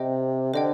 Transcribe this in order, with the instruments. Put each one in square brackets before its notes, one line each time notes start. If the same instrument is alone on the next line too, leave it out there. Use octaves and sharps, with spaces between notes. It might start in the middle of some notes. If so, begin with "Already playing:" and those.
Already playing: [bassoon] C3 [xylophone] C5 D#5 G5
[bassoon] D3 [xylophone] C5 D#5 G5